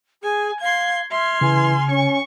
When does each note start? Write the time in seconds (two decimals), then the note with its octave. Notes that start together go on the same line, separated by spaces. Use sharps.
0.22 G#4 G#5
0.60 F5 C6 G#6
1.10 E5 C6 F6 G#6
1.41 C#3 E3 G#5
1.89 C#4 C#6